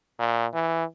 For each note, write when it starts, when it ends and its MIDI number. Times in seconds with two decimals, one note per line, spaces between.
0.20 0.47 46
0.54 0.84 52